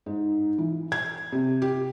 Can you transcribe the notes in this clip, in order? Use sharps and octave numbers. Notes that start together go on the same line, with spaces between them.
G#2
E3
G#6
C3
G4